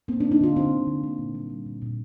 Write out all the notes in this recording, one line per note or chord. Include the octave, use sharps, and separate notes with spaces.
A#3 C4
D3 D4
D#4
D3 F4
D3 C4
D3
D3
A#3
A#2
G3
G3
A#2
A#2